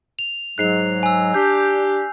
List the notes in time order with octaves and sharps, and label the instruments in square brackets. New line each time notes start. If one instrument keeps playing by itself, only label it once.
[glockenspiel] F7
[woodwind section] G#2 F#3 [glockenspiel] F#6 C7 F7
[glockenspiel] G#5 E6
[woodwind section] D4 G4 [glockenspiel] G6 C7